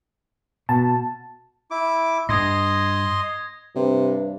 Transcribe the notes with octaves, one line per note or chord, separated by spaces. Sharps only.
B2 A5
E4 D6
G2 D#5 C6 D#6 G#6 A#6
G2 C3